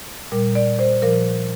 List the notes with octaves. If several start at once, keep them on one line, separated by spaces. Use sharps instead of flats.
A#2 G3 A#4
D5
C5
A#2 F3 A#4